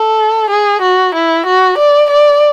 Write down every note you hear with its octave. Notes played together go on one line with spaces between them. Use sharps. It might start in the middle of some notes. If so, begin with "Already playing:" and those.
Already playing: A4
G#4
F#4
E4
F#4
D5
D5